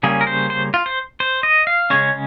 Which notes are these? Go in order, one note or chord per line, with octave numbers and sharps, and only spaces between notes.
C#3 G3 A#3 C#4 G#4
A#4
C5
C5
F4
C5
C5
D#5
F5
C#3 G#3 C#4 C#5